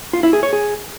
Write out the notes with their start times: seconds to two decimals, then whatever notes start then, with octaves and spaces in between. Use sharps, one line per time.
0.13 F4
0.23 E4
0.33 G#4
0.43 C#5
0.53 G#4